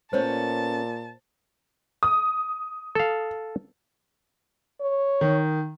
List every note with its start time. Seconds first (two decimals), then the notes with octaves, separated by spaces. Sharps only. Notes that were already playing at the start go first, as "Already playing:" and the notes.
0.13 A#2 A3 B3 C#4 C5 C#5 A5
2.03 D#6
2.95 A4 F5
4.81 C#5
5.21 D#3